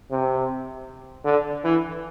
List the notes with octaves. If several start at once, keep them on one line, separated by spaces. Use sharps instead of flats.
C3
D3
E3